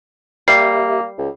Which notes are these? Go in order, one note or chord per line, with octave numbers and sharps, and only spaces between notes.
G3 A#3 G4 E5 C7
C#2